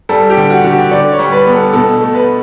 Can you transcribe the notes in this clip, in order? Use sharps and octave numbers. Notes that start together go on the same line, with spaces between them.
G3 A4
G4
D3
F#4
D3
G4
D3 D5
C#5
G3
B4
B3
A4
B2 A4
A3
B4